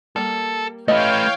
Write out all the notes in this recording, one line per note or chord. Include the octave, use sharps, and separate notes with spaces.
G3 A#3 A4
E3 A3 G4 B4 C#5 D#5 F5 G5